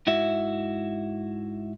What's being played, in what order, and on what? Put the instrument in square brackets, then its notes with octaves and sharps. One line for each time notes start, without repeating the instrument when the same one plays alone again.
[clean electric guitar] G#2 E4 F#4 E5